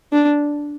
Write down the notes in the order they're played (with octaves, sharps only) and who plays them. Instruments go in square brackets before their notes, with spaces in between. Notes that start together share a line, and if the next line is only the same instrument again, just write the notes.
[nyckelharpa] D4